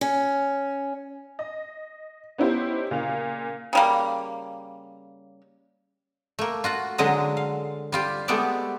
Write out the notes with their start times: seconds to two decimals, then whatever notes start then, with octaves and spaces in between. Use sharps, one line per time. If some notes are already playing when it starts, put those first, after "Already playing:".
0.01 C#4
1.39 D#5
2.38 B3 C#4 D#4 E4 G4 C5
2.91 A#2 C#3 F5 F7
3.73 C#3 G3 A#3
6.39 A3 A#3
6.64 F4 F#4 F#5
6.98 D3 F#3 G#3 A#5
7.37 F5
7.92 G3 F4 G4
8.28 G#3 A3 B3 G4 A4 D5